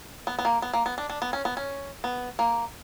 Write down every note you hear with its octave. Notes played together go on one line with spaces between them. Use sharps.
B3
B3
A#3
B3
A#3
B3
D4
D4
B3
C#4
B3
C#4
B3
A#3